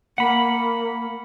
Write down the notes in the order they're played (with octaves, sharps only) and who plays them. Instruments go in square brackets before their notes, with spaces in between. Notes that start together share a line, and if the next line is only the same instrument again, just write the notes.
[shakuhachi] A#3 [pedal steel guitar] F#5 B5